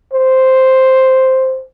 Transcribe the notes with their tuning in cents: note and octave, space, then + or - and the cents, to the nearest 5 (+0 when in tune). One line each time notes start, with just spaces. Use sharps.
C5 +0